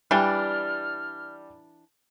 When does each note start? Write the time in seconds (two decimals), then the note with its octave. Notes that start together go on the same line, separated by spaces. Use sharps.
0.11 E3 G3 D4 G5 F6